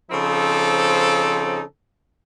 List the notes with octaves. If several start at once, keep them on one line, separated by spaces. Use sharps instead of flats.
C#3 F3 C4 D#4 A4